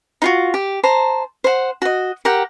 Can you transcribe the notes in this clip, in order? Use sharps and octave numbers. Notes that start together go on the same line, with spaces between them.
D#4 F4 F#4
G4
C5 A5 A#5
C5 F#5
F#4 D#5
G4 A#4 F#5 G5